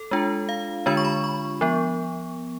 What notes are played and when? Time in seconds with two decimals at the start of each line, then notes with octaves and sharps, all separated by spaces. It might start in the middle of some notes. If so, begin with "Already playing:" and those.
Already playing: A4
0.11 G#3 D4 F4
0.49 F5
0.86 D3 G#3 D4 F4 B5
0.97 C#6
1.05 B5
1.24 C#6
1.61 F3 B3